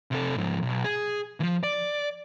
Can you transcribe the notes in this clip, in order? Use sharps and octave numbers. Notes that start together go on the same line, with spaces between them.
C3 A4
G#2 F3
B1
G#4
E3 F3
D5